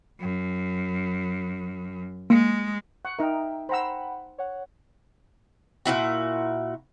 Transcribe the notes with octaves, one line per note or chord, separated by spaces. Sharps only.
F#2
G#3 A#3
F#5 C#6
D#4 A#4 E5 G5
C5 F#5 G5 A#5 B5 E6
C#5 F#5
A#2 E3 E4 F#4